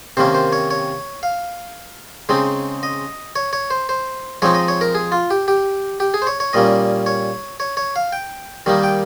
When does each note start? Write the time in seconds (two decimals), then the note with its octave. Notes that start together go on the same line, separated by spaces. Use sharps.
0.17 C3 D#3 A#3 C#4 C5
0.34 C5
0.53 C#5
0.70 C#5
1.23 F5
2.29 C#3 G#3 C4 D#4
2.83 D#5
3.36 C#5
3.53 C#5
3.71 C5
3.89 C5
4.42 F3 G#3 C4 D#4 C#5
4.55 D#5
4.68 C#5
4.81 A#4
4.95 G#4
5.12 F4
5.31 G4
5.48 G4
6.00 G4
6.14 G#4
6.22 C5
6.27 C#5
6.40 C#5
6.53 A#2 G3 A#3 C#4 D#5
7.06 C#5
7.60 C#5
7.77 C#5
7.96 F5
8.13 G5
8.66 D#3 G3 A#3 D#4
8.83 G5